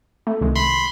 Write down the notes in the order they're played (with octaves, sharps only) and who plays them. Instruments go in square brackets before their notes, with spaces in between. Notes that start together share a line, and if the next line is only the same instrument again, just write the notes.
[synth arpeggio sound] A3
C2 D#3 G#3
[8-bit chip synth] B5 C6